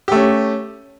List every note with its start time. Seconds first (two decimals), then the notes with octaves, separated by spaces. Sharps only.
0.08 G4
0.12 A3
0.15 C#4